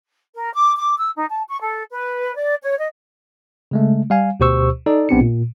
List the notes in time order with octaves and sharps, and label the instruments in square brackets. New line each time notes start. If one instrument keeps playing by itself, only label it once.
[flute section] A#4
D6
D6
E6
D#4
A5
C#6
A4
B4
D5
C#5
D#5
[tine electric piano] C#3 G#3 A3
G3 F5 G#5
D2 B2 G4 C5 C#6 E6
D#4 A4 D5
A#1 B3 C4 D4 G4 C#7
A#2